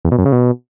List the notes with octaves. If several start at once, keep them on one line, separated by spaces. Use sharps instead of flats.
E2
B2
F#2
C#3
B2